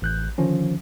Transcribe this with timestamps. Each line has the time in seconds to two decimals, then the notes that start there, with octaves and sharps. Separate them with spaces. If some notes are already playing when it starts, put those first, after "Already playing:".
0.02 A1 F#6 G6
0.38 D3 D#3 F3 C#4